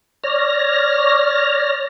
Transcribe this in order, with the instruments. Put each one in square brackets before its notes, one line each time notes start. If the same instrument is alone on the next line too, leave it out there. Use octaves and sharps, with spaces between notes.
[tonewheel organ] C#5 D5 F6 A#6